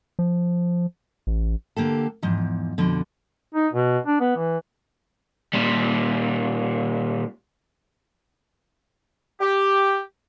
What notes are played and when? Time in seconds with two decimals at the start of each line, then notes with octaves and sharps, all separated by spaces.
0.19 F3
1.27 A1
1.76 D3 A#3 G4 A4
2.23 E2 G#2 F3
2.78 F2 B2 D3
3.55 D#4
3.73 B2
4.06 D4
4.20 B3
4.36 E3
5.53 A#2 G3
9.41 G4